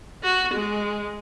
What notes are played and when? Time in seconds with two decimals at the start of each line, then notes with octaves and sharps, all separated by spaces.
0.23 F#4
0.54 G#3